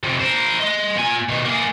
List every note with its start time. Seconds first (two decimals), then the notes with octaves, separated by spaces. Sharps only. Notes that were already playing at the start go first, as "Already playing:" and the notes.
0.03 F2 C3
0.20 A#4 C5
0.60 D#5 C6
0.96 A#2 G#5
1.29 B2 D#3
1.45 A#3 G#4